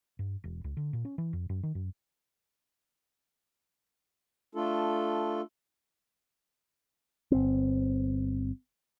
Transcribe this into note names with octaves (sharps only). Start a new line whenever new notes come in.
G2
E1
C#2
D3
A#2
C#4
E3
F2
F#2
D#3
F#2
A3 D4 F4 A4
G1 C4